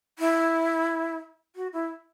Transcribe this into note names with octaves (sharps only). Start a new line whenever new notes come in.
E4
F#4
E4